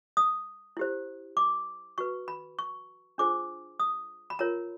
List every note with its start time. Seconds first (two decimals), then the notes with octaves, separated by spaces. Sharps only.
0.17 D#6
0.77 E4 G4 C5
1.37 D6
1.98 F#4 B4 C#6
2.28 B5
2.59 C#6
3.18 D4 F4 G#4 C5 D6
3.80 D#6
4.30 B5
4.39 F4 A#4 C#5 A#5